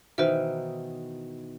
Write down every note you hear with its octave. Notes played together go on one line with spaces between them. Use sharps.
B2 D#3 E3 C5 E5